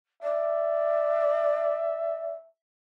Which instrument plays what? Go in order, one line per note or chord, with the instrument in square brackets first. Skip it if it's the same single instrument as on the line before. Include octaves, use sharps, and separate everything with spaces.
[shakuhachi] D5 [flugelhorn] E5